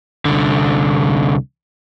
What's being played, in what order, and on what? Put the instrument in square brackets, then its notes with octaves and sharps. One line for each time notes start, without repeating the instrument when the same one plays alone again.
[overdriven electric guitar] C2 D3